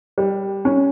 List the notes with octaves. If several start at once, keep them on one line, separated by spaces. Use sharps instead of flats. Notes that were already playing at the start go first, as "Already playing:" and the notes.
G3
C#4